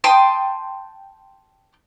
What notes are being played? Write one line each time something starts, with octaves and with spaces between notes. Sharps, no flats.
G5 A5 C6 D#6